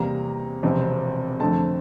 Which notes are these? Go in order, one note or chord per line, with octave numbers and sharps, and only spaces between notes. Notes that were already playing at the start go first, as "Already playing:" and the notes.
Already playing: E2 C3 G3 A#3 A#5
E1 E2 C3 F3 C4
F2 D3 A3 C4 A5